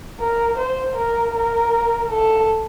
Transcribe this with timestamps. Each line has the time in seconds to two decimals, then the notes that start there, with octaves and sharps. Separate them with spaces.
0.19 A#4
0.57 C5
0.96 A#4
1.34 A#4
2.09 A4